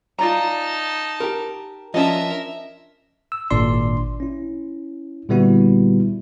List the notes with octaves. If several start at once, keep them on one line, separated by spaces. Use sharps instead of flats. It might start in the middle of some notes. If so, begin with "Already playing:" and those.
D#4 F4 D5 A5 A#5
G4 A#4
F3 C#4 D4 A#4 D#5 E5 A5
E6
G#1 A#2 D4 D5 C6
C#4 E4
A#2 D3 G3 B3 E4 F#4